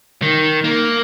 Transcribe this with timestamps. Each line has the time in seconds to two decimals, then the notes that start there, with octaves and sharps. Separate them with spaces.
0.22 D#3
0.64 A#3